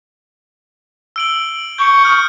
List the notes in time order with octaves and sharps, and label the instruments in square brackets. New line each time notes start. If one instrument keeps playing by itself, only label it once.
[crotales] E6 D7 F#7
[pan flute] C#6 [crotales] G6 C#7
[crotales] D#6 F6